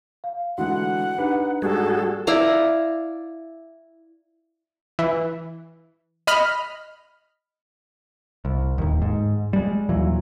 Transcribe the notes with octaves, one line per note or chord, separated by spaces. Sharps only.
F5
D3 E3 G#3 F#4 F#5
D4 D#4 G4 B4
G#2 G3 F#4 G#4 A4
E4 D5 F5 A#5
E3
D#5 B5 F6
C2
D1 G1 D#2
G#2
G3 G#3
D#2 A#2 E3 F#3